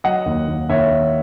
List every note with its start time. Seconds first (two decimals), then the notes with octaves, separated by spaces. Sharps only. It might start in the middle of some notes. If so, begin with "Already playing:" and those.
0.04 F#3 D#5 F#5
0.26 D#2
0.48 D#2
0.69 D#2 C#5 E5
0.91 D#2